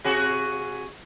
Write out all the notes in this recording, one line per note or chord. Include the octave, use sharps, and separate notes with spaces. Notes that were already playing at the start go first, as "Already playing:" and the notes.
C3 F#4 G#4